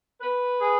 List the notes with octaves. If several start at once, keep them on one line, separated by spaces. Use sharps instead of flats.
B4
G#4